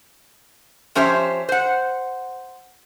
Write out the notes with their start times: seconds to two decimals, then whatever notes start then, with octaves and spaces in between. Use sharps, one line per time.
0.95 F3 C#4 G4 C5 C#5 E5
1.49 C5 F#5